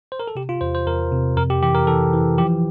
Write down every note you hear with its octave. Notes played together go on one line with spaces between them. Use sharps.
C5
A#4
A4
C3 G4
F4
E2 C5
C5
E2 A#4
C3
F2 A#4
G4
E3 G4
A#4
E3 A4
E3
F3 G4